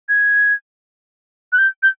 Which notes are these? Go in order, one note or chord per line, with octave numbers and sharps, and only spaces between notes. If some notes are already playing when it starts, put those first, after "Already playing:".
G#6
F#6
G6
G6